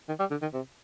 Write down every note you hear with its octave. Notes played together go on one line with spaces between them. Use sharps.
D#3
G3
D3
D#3
C3